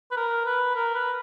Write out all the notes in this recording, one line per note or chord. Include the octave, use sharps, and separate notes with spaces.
B4
A#4
B4
A#4
B4